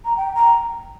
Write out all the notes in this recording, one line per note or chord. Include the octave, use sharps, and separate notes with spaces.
A#5
G5
A#5